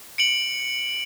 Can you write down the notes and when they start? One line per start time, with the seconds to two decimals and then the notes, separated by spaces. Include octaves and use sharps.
0.18 C#7 D7 F#7